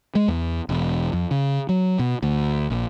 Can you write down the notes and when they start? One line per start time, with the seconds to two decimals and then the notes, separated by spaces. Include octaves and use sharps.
0.15 G#3
0.28 E2
0.69 E1
1.13 F2
1.31 C#3
1.69 F#3
1.99 B2
2.23 D2
2.70 A#1